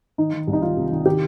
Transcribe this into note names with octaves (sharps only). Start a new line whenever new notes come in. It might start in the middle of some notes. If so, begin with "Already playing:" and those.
D#3 D#4
D#3
C2
D#4
D#3 F4
C3
D#3
D#3 G4